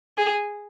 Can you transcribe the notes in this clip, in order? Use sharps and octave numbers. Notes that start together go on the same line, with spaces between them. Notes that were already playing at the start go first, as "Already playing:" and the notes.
G#4